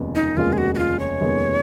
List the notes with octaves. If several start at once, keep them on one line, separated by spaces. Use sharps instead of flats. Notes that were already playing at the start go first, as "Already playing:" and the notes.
Already playing: F1 D#2 C#3 G#3 B3
D#4
F1 D#2 C#3 G#3 B3 F4
G#4
F#4
F#4
F4
C#5
F1 D#2 C#3 G#3 B3